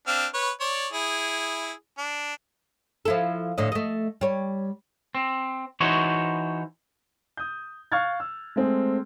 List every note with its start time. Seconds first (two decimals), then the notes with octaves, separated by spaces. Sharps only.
0.07 C4 D4 F5
0.34 B4 C#5
0.61 C#5 D5
0.93 E4 G#4
1.98 D4
3.05 F3 E4 A4
3.58 A2 D3 D#5
3.72 A3 D#5
4.21 G3 C#5
5.15 C4
5.80 E3 D#4 F#4 C5 C#5
7.37 D#6 G6
7.92 F5 C#6 F6 F#6 G#6 A6
8.20 E6
8.56 G#3 A3 C4 G#4